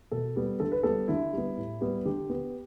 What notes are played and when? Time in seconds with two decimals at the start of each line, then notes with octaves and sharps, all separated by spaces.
0.11 B2 A4
0.36 G3 B3
0.60 D3 A4
0.72 B4
0.83 G3 B3 A4
1.08 D3 E4
1.33 G3 B3
1.58 A2
1.81 G3 B3
2.06 D3 G4
2.30 B3